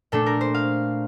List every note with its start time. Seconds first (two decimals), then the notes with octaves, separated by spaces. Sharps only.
0.12 A#2 A3 D4 A4
0.26 A#4
0.41 C5
0.54 F5